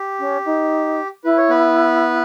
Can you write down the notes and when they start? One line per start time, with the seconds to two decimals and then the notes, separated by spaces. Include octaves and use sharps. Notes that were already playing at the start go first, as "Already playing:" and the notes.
Already playing: G4
0.20 C#4
0.46 D#4
1.24 E4 B4
1.37 C#5
1.49 B3 B4